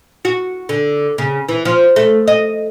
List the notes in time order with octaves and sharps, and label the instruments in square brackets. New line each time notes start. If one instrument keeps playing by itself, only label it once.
[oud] F#4
D3
C#3
E3
F3
A3
D#5